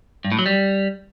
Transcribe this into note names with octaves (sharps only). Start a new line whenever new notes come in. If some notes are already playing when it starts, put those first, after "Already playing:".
G2
A2
F#3
G3